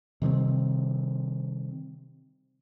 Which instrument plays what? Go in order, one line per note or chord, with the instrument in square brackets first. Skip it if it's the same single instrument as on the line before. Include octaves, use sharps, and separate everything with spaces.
[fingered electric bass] C3 D#3 G3 C4